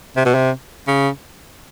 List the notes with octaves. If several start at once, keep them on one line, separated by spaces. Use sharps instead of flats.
C3
B2
C3
C#3